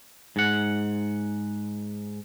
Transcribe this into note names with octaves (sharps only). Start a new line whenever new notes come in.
G#2 F#5